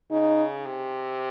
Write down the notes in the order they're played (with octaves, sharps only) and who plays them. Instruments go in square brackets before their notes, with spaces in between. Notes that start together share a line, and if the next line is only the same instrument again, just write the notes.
[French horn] C#3 [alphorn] D#4
[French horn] C3